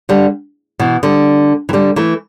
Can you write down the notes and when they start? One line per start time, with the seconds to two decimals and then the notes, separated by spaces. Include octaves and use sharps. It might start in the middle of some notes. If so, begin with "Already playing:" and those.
0.09 D3 G3
0.79 B2 E3
1.03 D3 G3
1.69 E3
1.73 D3 G3
1.96 E3 A3